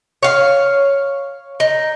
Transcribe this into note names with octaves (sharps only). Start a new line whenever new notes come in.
C#5 F5
D#4